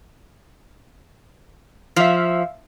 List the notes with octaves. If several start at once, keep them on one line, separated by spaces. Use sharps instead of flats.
F3 E5 F5